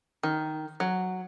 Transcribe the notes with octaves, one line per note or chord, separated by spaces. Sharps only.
D#3
F#3